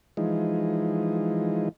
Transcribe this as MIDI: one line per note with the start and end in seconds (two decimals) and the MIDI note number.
0.17 1.69 52
0.17 1.69 53
0.17 1.69 56
0.17 1.69 63